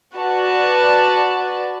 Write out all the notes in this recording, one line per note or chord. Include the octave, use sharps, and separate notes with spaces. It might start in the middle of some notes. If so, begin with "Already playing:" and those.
F#4 B4 D5 A5